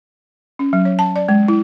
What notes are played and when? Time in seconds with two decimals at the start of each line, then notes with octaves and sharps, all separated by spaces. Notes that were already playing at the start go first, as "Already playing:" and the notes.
0.59 C#4
0.73 F#3
0.85 C#5
0.99 A5
1.16 D5
1.28 G#3
1.48 E4